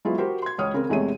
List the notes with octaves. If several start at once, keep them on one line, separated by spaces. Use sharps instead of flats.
F#3 G#3 B3 E4 F4
F#4 G4 A#4 C5
C6 G#6
C#2 C#5 D#6 F6
C#3 C4 A#4
E2 C3 G#3 A3 C#5 D#7